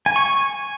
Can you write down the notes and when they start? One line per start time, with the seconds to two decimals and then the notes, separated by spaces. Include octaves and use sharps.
0.06 G#5
0.16 C#6
0.26 G#5